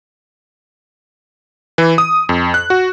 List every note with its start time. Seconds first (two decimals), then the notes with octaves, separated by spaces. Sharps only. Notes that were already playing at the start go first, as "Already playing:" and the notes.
1.78 E3
1.98 D#6
2.29 F2
2.54 F#6
2.70 F#4